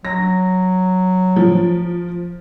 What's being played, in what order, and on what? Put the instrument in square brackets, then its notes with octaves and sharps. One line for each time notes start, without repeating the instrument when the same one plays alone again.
[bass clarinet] F#3 [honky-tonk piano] A#6
[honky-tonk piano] F3